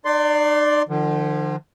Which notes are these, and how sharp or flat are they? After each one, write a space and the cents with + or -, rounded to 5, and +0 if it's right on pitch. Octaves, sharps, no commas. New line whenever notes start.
D#4 -45 D5 +0 C6 +0
D3 +40 F3 -15